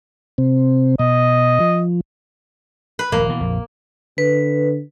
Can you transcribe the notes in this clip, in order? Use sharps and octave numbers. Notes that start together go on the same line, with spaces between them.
C3 C4
B2 D#5
F3
B4
D#1 A#1 G2 A#3
B2 E3
A#1 F2
D3 B4